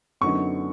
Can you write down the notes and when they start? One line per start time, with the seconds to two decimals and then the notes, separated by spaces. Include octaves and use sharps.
0.21 F#2 D3 F#3 B3 D#4 C#6